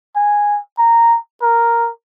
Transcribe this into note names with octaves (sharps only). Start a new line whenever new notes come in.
G#5
A#5
A#4